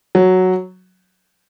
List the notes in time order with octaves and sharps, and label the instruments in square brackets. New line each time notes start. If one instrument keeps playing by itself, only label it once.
[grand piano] F#3